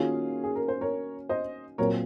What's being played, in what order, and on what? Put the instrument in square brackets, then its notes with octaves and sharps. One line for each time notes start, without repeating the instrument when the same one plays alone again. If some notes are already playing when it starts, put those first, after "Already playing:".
Already playing: [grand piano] D#3 A#3 C#4 F#4 [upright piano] F4 G#4
[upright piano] G#4
A#4
C5
A#4 C#5
C5 D#5
[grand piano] A#2 F#3 C4 [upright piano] A#4 C#5